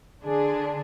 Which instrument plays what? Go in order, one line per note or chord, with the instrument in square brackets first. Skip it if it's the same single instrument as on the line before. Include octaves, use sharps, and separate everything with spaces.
[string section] D3 D4 G#4